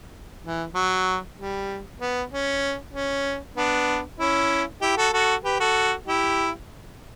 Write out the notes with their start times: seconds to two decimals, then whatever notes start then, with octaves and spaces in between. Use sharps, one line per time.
0.43 E3
0.75 F#3
1.38 G3
2.01 B3
2.31 C#4
2.94 C#4
3.57 B3 D4
4.20 C#4 E4
4.82 E4 G4
4.97 F#4 A4
5.13 F#4 A4
5.44 G4 B4
5.60 F#4 A4
6.07 E4 G4